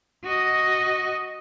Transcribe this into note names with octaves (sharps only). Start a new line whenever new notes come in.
F#4 D#5